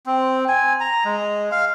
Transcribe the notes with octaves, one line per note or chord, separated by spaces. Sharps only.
C4
G#5
A#5
G#3
F5